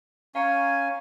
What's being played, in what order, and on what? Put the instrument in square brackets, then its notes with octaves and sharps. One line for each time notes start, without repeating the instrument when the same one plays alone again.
[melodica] C#4 G#5 [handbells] F5 A#5 C#7